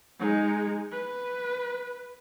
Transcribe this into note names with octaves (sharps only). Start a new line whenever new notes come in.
G#3 D#4
B4